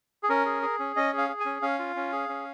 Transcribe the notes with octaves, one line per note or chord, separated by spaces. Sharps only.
G#4
C#4 A#4
G#4
G#4
C#4
C#4 D#5
G#4 F5
G#4
G#5
C#4
C#4 F5
F4
C#4
G#4
C#4